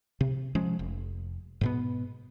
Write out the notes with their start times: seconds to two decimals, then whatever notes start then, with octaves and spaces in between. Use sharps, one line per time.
0.21 C3
0.55 F3 G#3 C#4
0.79 F1
1.61 G#2 B2 B3